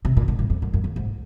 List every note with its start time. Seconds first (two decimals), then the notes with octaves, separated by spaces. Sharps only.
0.05 C3
0.17 A#2
0.28 G#2
0.39 F#2
0.50 F2
0.62 F#2
0.74 F#2
0.84 F2
0.96 G#2